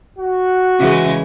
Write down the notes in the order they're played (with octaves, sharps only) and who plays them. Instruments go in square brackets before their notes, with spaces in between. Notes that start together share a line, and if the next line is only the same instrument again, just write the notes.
[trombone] F#4
[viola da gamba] C#3 E3 G#3